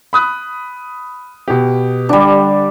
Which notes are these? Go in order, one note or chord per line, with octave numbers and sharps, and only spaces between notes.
B5 D#6 F#6
B2 G4
D3 G3 D4 G4